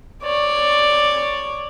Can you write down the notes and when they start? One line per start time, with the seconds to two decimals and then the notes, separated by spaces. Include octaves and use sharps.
0.23 C#5 D5